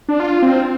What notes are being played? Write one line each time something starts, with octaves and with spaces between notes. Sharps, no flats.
D4
F4
F4
C4